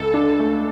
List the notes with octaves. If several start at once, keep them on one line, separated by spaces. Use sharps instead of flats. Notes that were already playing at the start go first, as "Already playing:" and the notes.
Already playing: C#2 A4
D4
A3